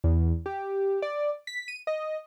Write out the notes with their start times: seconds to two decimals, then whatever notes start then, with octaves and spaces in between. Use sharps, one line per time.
0.04 E2
0.46 G4
1.02 D5
1.47 B6
1.68 D#7
1.87 D#5